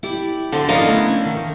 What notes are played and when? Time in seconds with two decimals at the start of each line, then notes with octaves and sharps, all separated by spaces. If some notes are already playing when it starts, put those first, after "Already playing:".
0.03 E4 G4 D5
0.52 D3 E4 C6
0.68 B3 C#4 D4 E4 A#4 D#5 F5 A#5
0.88 A3
1.26 D#3